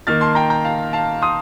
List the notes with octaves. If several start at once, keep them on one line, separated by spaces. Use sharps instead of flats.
D#3 A#3 D#4 F6 A6
A5 C6
G5 A#5
G5 A#5
F5 A5
F5 A5
C6 D#6